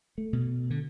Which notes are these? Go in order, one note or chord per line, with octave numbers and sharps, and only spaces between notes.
A3
B2
D3